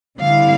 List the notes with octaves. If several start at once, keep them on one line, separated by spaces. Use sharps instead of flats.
D3 G3 C4 E4 F5